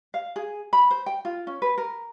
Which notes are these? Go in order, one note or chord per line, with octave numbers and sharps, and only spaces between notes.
F5
G#4
B5
C5
G5
F4
C#4
B4
A#4